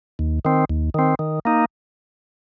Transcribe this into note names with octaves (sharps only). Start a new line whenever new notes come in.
D#2
D#3 C4
D#2
D#3 C4
D#3
A#3 D#4